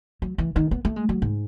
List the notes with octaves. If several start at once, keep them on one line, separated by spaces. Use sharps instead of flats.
F#3
E3
D#3
B3
A3
G#3
F#3
G#2